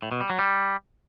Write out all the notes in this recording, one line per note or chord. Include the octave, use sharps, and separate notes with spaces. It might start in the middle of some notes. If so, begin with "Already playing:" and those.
A2
B2
G3
F#3
G3